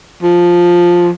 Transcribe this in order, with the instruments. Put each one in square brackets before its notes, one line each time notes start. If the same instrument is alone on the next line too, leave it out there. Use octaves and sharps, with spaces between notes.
[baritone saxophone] F3